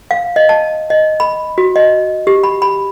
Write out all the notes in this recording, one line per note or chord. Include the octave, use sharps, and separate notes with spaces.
F5
D#5
A5
D#5
B5
F#4
D#5
G4
B5
B5